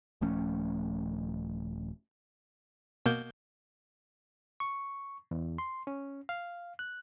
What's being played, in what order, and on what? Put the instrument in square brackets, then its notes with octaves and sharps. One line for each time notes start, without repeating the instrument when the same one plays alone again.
[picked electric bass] D#1 F3 A3 C#4
[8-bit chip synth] B2 A#3 G6
[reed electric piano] C#6
E2
C6
C#4
F5
F#6